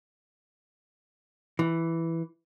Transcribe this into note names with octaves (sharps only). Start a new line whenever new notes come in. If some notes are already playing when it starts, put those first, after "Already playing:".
E3